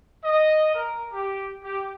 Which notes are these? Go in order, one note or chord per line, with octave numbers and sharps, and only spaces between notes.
D#5
A#4
G4
G4